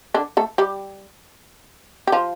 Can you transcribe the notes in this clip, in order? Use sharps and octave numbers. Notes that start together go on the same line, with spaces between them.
D3 D4
A3 A4
G3 G4
G4
F3 F4